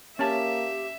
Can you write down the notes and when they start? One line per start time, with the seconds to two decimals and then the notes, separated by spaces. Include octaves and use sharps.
0.19 A#3 C#4 G4 E5 A5